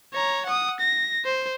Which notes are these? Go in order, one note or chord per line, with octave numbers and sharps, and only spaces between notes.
C#5 A#5
F#5 D#6
A#6
C5